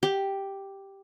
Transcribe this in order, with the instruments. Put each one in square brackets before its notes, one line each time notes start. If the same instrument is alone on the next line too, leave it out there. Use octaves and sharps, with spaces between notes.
[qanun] G4